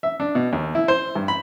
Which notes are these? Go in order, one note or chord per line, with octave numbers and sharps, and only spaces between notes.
E5
D4
B2
D#2
E4
C5
G2
B5